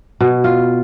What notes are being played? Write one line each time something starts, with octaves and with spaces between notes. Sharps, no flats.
B2
F4